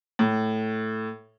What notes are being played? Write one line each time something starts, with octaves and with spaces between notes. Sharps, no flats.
A2